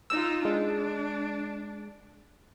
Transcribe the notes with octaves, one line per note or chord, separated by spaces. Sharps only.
D#4 F4 E6
G#3 D4